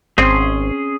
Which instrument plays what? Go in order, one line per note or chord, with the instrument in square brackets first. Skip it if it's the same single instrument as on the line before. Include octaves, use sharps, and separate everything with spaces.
[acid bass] G#1 [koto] C4 [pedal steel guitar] C#4 C6 [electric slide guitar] G#4